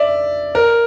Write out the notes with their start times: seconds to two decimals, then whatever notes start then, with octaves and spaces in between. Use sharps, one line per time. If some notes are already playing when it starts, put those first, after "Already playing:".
Already playing: D5 E5
0.55 A#4